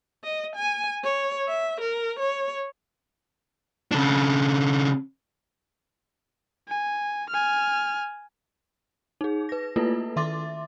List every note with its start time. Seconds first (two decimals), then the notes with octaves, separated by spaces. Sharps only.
0.24 D#5
0.56 G#5
1.04 C#5
1.48 E5
1.81 A#4
2.20 C#5
3.92 C#3 D4
6.69 G#5
7.29 G#5 F6
9.21 D#4 G#4
9.49 B4 A#6
9.76 A3 A#3 E4 F4 A4 B4
10.16 D#3 E5 C6 D6 A6